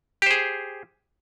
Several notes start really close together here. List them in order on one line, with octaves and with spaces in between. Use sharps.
G4 C5 G#4